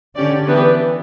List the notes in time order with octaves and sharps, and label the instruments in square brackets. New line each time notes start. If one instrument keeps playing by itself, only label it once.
[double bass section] D3 [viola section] C#4 G4 D5
[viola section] E3 B3 D4 G4 B4